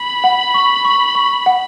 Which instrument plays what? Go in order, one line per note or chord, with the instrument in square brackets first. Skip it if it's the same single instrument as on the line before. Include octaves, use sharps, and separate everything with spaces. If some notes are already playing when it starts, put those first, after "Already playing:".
Already playing: [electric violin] B5
[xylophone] F#5
C#6
C#6
C#6
F#5